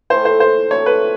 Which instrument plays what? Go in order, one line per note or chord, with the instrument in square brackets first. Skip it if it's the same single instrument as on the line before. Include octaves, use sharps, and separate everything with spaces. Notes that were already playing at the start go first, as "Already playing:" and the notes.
[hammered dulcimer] A2 E3 A3 [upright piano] C5
[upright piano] C5
C5
[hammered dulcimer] D3 F#3 A3 C4 [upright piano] C#5
[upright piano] B4